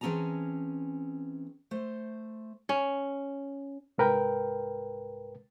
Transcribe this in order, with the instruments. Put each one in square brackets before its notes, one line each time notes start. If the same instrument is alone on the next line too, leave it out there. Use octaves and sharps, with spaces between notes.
[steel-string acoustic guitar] E3 C4 C#4 G#4 A5 A#5
A3 C5
[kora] C#4
[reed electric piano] C2 G#2 A#4 B4 G5